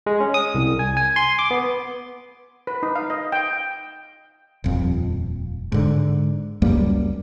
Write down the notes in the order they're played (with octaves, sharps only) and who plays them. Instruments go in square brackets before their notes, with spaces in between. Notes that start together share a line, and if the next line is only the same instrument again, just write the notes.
[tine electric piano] G#3
C#4
D#6
C2
G#5
G#5
C6
D6
B3
[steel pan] B4
D#4
F5
D#5
G5
[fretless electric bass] D#1 F2
G#2 D3
C#2 F#2 G3 A#3